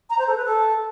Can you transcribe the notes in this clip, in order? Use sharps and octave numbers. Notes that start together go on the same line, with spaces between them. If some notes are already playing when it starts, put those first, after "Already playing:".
A#5
C5
A4
B4
A4